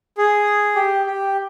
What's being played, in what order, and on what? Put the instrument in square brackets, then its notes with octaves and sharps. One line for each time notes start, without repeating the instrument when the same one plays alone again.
[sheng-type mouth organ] G#4
G4
G4